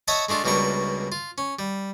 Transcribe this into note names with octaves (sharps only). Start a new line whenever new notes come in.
C#5 D#5 E5 F#5 A5
G#3 A3 D4 F4
C#2 B2 G3 A#3 D4 C#6
F4
C#4
G3